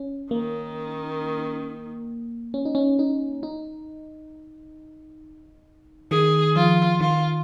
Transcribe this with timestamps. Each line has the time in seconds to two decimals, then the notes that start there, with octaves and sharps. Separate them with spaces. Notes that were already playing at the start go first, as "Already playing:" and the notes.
Already playing: C#4
0.31 D#3 A#3
2.54 C#4
2.65 D#4
2.75 C#4
2.99 D#4
3.43 D#4
6.11 D#3 G#4
6.56 F3 F4
7.00 D#3 F4